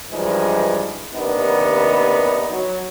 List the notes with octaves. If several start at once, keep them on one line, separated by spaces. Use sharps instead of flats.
G2 E3 F3 G#3 D4 D#4
D#2 C3 D#3 B3 D4 D#4
F#3